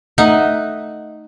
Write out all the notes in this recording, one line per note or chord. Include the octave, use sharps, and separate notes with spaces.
A3 D#4 D#5 E5 F#5